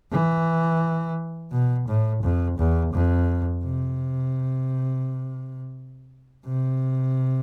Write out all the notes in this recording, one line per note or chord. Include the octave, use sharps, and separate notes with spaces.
E3
B2
A2
F2
E2
F2
C3
C3